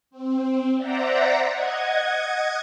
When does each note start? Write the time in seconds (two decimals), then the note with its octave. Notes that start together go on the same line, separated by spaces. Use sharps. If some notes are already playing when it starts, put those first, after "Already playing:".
0.11 C4
0.76 C5 D5 E5 F#5 A#5
1.48 D#5 F#5 G#6